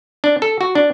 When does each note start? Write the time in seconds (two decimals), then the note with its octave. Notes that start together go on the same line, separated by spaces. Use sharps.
0.24 D4
0.42 A4
0.61 F#4
0.75 D4